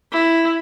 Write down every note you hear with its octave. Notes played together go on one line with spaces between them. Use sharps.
E4